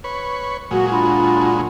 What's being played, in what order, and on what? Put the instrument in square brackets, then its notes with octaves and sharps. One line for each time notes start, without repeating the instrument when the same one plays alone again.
[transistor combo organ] B4 C#5
[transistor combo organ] A#2 F#3 G#3 [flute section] F#4
[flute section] D4 F4 B5